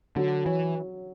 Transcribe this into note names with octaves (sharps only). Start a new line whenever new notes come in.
D3 F#3
E3 C#5